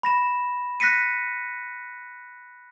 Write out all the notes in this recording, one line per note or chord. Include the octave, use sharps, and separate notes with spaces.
B5 A#6 E7
F#6 A#6 B6 C#7 D#7